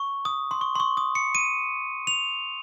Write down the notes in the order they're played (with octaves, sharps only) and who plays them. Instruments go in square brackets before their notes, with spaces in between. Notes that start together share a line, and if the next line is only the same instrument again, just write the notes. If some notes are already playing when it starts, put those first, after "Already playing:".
Already playing: [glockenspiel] C#6
D#6
C6
C#6
C6
C#6
D#6
C#7
D#7
F7